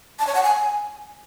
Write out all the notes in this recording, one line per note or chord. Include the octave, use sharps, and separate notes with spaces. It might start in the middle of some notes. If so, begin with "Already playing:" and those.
A5
C#5
F#5
G#5